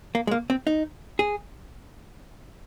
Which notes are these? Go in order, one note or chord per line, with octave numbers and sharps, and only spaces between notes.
A#3
G#3
A#3
C4
D#4
G#4